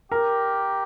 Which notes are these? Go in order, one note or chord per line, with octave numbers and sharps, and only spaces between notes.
G4 A#4